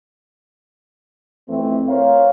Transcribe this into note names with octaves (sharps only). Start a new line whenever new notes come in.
F2 E3 A3 C4
A#4 C5 C#5 F5